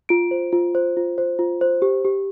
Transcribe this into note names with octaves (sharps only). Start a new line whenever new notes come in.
F4 D7
C5
F4
C5
F4
C5
F4
C5
G4
G4